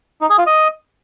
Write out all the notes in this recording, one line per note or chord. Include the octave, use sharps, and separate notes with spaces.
D#4
G#4
F4
D#5